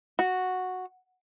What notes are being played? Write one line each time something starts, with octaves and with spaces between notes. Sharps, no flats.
F#4